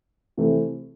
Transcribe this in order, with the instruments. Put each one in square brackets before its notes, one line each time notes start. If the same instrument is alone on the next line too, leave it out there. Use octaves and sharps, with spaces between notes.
[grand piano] C3 E3 A3 C4